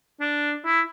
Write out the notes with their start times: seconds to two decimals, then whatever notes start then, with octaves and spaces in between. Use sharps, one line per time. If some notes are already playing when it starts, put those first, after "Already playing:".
0.20 D4
0.65 E4